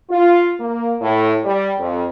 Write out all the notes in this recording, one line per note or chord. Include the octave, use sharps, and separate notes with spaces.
F4
A#3
A2
G3
F2